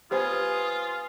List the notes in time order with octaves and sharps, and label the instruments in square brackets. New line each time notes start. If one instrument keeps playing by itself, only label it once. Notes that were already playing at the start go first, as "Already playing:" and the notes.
[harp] B3 G#5 [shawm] F4 [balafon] G4 C5 [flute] D#6